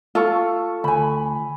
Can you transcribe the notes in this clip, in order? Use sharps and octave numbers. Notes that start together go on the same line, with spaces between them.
A3 F4 A4 C#6
D2 G#5 B5